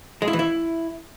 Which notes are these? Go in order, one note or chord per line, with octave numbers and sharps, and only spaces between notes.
G#3
E4
E3
E4